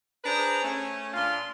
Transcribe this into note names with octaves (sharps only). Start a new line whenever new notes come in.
D4 G#4 B4 C5 A#5
A3 C#4
A#2 D4 F4 C6